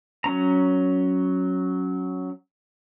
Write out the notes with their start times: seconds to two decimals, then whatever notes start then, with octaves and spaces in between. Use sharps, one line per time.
0.24 F#3 C#4 A#5